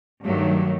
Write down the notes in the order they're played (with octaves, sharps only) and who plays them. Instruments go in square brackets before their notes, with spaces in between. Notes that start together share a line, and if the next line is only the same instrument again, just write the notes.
[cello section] G2 D#3 F#3 A3